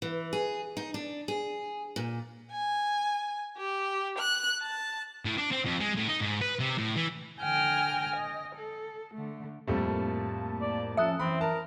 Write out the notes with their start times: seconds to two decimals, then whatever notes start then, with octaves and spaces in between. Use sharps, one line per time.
0.02 E3
0.33 G#4
0.77 D#4
0.94 D4
1.28 G#4
1.96 A#2
2.52 G#5
3.58 G4
4.19 F#6
4.61 A5
5.26 A2
5.38 D4
5.52 C4
5.65 F2
5.81 G#3
5.97 A2
6.09 D#4
6.21 G#2
6.41 B4
6.59 C3
6.78 A2
6.96 E3
7.40 D3 G5 G#5 F6 A#6
8.17 D#5
8.55 A4
9.15 D3 A3
9.67 F2 A2 G3 A3 A#3 A5
10.61 D5
10.97 F3 C#4 A4 E5 D#6 F#6
11.20 F#2 E3 C4 B5
11.41 A#4 A5